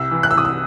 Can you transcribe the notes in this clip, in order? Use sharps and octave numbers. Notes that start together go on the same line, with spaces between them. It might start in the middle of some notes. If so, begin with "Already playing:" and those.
Already playing: C2 E6
E3
F#6
E6
C2 D#6
E6